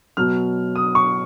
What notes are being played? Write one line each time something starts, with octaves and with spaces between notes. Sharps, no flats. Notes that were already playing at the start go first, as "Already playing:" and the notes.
B2 F#3 F6
D#6
C#6